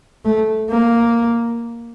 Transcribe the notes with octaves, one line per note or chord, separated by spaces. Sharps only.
A3
A#3